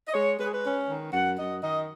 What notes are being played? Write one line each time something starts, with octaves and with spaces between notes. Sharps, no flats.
D#5
G#3 C#5
G#3 B4
G#4
B4
C#4
D#3
F#2 F#5
F#2 D#5
D#3 D#5